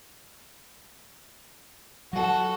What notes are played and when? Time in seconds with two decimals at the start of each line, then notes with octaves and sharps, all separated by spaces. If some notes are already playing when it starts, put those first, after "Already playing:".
2.13 F#3 F#4 A4 F#5